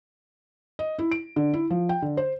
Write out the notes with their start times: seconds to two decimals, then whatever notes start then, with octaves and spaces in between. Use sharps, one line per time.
0.79 D#5
0.99 E4
1.12 D7
1.36 D3
1.53 E4
1.70 F3
1.89 G5
2.02 D3
2.17 C5